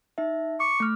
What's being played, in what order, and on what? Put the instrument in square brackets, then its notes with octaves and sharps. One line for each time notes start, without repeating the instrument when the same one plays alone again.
[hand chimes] D#4 E5
[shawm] C#6 [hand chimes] D6
[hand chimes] A3 F6